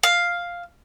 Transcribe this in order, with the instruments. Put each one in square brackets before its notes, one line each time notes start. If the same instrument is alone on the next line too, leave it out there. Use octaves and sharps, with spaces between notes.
[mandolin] F5